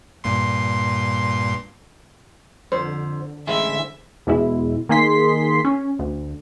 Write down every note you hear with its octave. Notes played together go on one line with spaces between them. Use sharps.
G2 A#2 C6
F2 D3 C5
A1 G#3 E4 C5 E5
E2 B2 G#3 E4
D#3 A#3 G#4 C6 B6 C7
C#4
D2